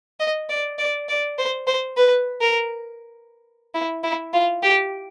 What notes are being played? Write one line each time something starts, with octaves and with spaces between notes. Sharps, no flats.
D#5
D5
D5
D5
C5
C5
B4
A#4
E4
E4
F4
G4